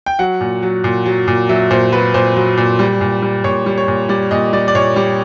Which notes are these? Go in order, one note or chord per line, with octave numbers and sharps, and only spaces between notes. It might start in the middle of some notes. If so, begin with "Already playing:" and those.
G5
F#3 F#5
A#2
F#3
A#2
F#3
A#2
F#3 E5
A#2 C5
F#3 B4
A#2 C5
F#3
A#2
G3
A#2
G3
A#2 C#5
G3
C#5
A#2
G3 D5
A#2 D#5
G3 D5
D5
A#2 C#5
G3